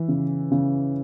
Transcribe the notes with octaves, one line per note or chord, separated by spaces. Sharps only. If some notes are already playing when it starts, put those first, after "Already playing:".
Already playing: E3
C#3
C#3